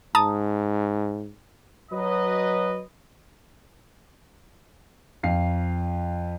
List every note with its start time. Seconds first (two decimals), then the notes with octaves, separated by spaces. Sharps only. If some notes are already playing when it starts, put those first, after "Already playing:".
0.15 G#2 A5 A#5 D#6
1.91 F#3 B4 D#5
5.23 F2 F5 C7